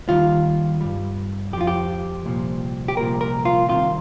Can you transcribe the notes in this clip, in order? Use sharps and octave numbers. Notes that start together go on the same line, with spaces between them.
D#2 D#3 G3 F4
G2 G3
F2 F3 F4 G4
G4
C2 A#2 F3
G4
C2 A#2 F3 A#4
A#4
F4
C2 C3 D#3 F4